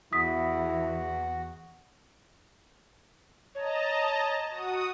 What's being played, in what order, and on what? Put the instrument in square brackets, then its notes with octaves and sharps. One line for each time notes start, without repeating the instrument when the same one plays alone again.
[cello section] E2 [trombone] E4 [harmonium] F#4 [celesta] D#6 B6
[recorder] C#5 [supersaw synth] D#5 A5 A#5
[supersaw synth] F#4 D#6